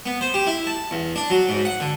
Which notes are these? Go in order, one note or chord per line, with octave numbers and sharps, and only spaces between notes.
B3
C5
G4
E4
A5
E2
D4
F#3
G#2
F#5
D3